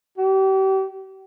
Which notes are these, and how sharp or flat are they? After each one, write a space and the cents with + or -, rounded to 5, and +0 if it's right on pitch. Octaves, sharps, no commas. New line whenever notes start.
G4 -35